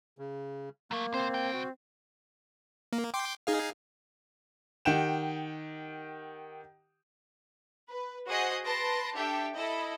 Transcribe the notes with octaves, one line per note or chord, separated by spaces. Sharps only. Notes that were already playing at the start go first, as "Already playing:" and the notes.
C#3
F#3 A3 A#3
C2 C4 C5
C2 G5
F#4
A#3
G5 C6 D6
D#4 G#4 F5
D#3 G4 F#5 G5 E7
B4
F#4 G#4 C5 D#5 F#5 D#6
B4 A5 C6 A#6 D7
D4 G4 A4 E5 G5
E4 A4 D#5